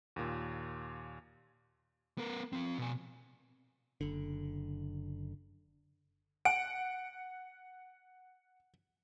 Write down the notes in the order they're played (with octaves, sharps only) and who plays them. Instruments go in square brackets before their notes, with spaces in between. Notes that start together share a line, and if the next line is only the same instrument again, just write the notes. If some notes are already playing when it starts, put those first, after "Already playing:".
[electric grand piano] D#2 A#2
[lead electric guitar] B3 A#4
F3 C4
B2 G#5
[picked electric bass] F#1 D3
[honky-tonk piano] F#5 [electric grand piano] D7